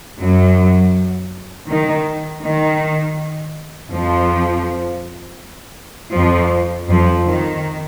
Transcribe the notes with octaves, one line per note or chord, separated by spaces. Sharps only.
F#2 F#3
D#3
D#3
F2 F3
F2 F3
F2 F3
D#3